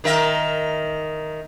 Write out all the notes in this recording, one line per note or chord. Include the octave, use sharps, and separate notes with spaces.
D#3 A#4 E5